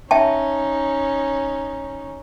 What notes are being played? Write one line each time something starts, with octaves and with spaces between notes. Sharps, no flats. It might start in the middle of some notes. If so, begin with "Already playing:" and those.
C#4 D#4 E5 G5 A5